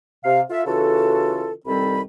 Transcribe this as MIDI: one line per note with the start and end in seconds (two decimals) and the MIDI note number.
0.24 0.41 48
0.24 0.41 77
0.50 0.61 65
0.50 0.61 69
0.50 0.61 76
0.65 1.52 49
0.65 1.52 52
0.65 1.52 65
0.65 1.52 66
0.65 1.52 69
1.66 2.00 36
1.66 2.00 51
1.66 2.00 55
1.66 2.00 60
1.66 2.00 69
1.66 2.00 83